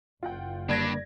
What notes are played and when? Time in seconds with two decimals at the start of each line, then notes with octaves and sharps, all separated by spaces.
0.23 F#1 F4 F#5 G5
0.69 D3 G3 A#3 D4 B4 D5 G#6 A#6